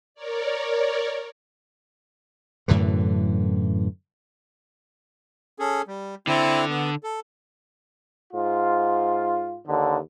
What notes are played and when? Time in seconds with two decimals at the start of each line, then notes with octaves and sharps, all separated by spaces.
0.15 A#4 C#5 D5
2.68 F#2 A2 D3 E3
5.59 C#4 G#4 A4
5.87 G3
6.27 D3 C4 E4
6.69 B3
7.04 A4
8.34 G#2 F4
9.67 D#2 D3